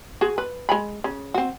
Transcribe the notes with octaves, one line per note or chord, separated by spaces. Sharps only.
F#4 G#4
B4
G#3 G#5 B5
C#3
C4 F#4